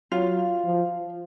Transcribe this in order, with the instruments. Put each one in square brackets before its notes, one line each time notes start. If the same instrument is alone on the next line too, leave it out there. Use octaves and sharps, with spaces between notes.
[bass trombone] F#3 [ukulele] F4
[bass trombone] F3